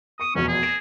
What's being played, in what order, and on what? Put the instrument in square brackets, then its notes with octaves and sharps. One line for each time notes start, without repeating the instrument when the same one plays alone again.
[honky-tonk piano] C#6 C#7 [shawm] D#6
[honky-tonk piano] F1 E2 B2 [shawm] C#4
[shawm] G#4
[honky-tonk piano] A#6 D7 E7